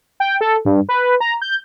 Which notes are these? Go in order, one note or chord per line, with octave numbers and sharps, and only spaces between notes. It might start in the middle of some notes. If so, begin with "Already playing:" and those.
G5
A4
G2
B4
A#5
G6